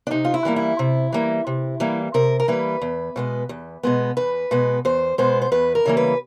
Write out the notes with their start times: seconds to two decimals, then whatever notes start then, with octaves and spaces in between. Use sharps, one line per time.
0.07 D4
0.11 C3 D#4
0.25 F4
0.34 E4
0.45 E3 G3 A#3
0.56 E4
0.79 C3
1.12 E3 G3 A#3
1.47 C3
1.80 E3 G3 A#3
2.14 C3 A#4
2.40 A#4
2.48 E3 G3 A#3 B4
2.82 E2
3.16 B2 G#3 B3
3.49 E2
3.83 B2 G#3 B3
4.17 E2 B4
4.51 B2 G#3 B3
4.85 E2 C5
5.18 B2 G#3 B3 C5
5.42 C5
5.52 E2 B4
5.75 A#4
5.86 C#3 E3 G3 A#3
5.97 B4